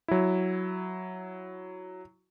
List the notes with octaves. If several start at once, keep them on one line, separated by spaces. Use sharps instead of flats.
F#3 E4